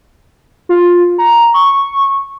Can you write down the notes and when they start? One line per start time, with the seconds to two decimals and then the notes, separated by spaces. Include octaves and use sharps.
0.69 F4
1.18 A#5
1.54 C#6